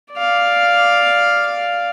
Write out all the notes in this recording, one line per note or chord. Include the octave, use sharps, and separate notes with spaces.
D5 F5